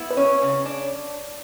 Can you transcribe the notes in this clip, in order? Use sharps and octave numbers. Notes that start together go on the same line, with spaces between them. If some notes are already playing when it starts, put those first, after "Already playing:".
Already playing: B3 E4
B4
C#4 C#5
C#3
D4